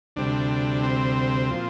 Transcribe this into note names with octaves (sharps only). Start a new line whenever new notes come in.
D2 C3 G3 D4
C4
A#2 F3